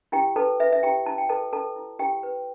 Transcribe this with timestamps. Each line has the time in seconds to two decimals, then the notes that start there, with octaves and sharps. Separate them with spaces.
0.12 E4 G4 G5
0.36 A4 B4 A5
0.60 B4 E5
0.72 E5
0.83 E4 G4 G5
1.06 E4 A5
1.18 G5
1.29 A4 B4 A5
1.53 A4 B4 A5
1.76 E4
1.99 E4 G4 G5
2.23 B4